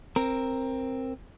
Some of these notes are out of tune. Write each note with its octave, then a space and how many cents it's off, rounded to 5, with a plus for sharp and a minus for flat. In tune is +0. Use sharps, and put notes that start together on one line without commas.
C4 +10 A#4 +0 A#5 +0